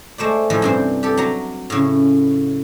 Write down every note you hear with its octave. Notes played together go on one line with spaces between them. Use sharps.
G#3 A3 C5 D5
A2 E3 F3 G#3
G2 C3 C5
G4 A4
F#3 A#5
A2 C#3